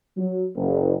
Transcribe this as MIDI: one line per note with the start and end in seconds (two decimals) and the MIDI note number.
0.17 0.46 54
0.56 0.94 30